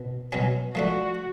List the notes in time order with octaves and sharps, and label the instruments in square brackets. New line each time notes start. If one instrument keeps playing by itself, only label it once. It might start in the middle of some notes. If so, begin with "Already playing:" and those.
Already playing: [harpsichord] B2
B2 F#3 C#4
[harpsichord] F3 A3 D4 [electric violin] F#4